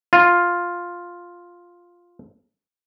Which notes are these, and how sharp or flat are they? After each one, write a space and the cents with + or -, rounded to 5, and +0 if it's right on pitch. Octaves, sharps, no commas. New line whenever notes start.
F4 +5